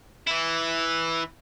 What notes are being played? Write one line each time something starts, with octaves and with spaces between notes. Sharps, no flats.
E3 E4